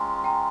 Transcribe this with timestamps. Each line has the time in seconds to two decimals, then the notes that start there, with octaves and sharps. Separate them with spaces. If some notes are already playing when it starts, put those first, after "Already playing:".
Already playing: G#3 C#4 F4 G5 A#5
0.24 G5 A#5